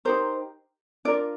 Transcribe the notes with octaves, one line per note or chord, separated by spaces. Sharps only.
D#4 G4 A#4 C5
D4 F4 A#4 D5